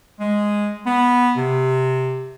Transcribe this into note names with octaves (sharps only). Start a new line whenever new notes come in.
G#3
B3
C3